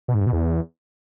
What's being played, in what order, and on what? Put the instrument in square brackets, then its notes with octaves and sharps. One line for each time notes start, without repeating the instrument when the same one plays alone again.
[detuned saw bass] B2
G#2
G2
B2
E2